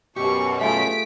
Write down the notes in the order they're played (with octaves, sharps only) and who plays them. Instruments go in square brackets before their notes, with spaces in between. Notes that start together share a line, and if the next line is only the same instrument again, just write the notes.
[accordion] F#2 B2 [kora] G4 [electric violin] C#6
[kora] A3 F4 G#4 [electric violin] B6 D7